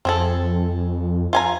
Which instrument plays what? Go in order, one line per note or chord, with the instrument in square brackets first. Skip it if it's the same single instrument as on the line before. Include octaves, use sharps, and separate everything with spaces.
[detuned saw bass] F2 [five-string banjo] C4 G#4 A4
[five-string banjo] F4 G#5 A#5